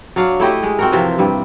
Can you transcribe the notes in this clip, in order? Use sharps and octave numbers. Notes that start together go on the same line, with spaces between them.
F#3 D4 F5
A3 E4 G4 D#5
G#3
C4 F#4 A#4
C3 E3 F3
G2 G3